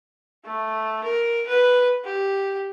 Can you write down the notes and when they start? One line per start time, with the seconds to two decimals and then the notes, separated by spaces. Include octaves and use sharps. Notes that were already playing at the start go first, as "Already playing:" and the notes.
0.45 A3
1.04 A#4
1.47 B4
2.05 G4